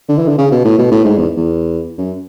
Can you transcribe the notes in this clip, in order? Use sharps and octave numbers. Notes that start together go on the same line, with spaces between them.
D3
E3
D3
C#3
B2
A2
B2
A2
G#2
E2
E2
F#2